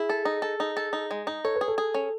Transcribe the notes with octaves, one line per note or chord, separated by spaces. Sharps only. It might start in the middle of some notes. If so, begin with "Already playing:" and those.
Already playing: E4 G#4
A4
D#4
A4
D#4
A4
D#4
G#3
D#4
A4 C#5
B4
G#4
A4
G#4
C#4